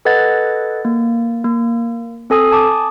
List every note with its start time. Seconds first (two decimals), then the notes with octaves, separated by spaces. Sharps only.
0.05 A4 B4 D#5 F#5 G#6 A6
0.85 A#3
1.44 A#3
2.30 C4 A4 G#5 D#6
2.51 G#5 A5 D6 D#6